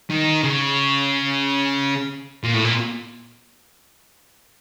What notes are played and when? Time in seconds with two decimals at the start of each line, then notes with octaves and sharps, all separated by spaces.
0.10 D#3
0.43 C#3
2.44 A#2
2.54 A2
2.64 A#2